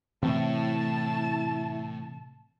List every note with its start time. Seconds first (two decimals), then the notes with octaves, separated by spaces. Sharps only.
0.23 A2 C3 E3 C4 E4 A5